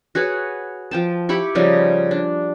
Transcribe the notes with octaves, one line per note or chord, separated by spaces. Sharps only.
F#4 G#4 B4 C#5
F3 G5 A5
E4 G4 B5 C#6
C#3 F3 G3 D#4
D4